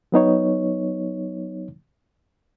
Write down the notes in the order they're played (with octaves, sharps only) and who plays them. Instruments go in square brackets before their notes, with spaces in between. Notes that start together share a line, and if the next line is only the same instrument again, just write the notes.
[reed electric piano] F#3 B3 D#4 C#5